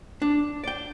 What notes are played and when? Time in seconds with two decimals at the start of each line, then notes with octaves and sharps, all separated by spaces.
0.22 D4
0.64 D5 G5